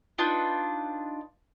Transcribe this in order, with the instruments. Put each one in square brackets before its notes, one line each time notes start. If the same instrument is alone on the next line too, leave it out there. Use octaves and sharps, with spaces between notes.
[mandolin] D4 D#4 F4 B4